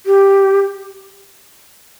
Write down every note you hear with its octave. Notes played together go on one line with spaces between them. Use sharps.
G4